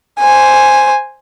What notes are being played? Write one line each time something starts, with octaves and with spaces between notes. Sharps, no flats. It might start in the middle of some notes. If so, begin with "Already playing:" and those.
C5 G#5